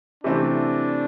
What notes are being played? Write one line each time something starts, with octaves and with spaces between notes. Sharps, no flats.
C3 E3 A3 C4 D4